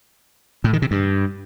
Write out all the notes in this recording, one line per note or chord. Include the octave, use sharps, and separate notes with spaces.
A2
D#3
C3
G2